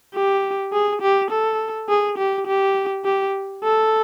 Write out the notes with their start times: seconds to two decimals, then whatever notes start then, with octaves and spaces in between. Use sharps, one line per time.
0.15 G4
0.73 G#4
1.02 G4
1.31 A4
1.89 G#4
2.18 G4
2.47 G4
3.05 G4
3.63 A4